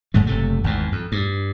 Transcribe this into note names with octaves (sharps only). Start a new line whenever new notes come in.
G1 G#2 G#3 A3
F#1 C3 A3
G#1 E2 G#2
F2
G2